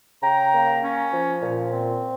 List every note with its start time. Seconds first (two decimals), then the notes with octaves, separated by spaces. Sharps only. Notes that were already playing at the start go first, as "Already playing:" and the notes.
0.23 C#3 G5 A#5
0.53 A#3
0.83 C#4
1.13 F3
1.43 A#2
1.73 C4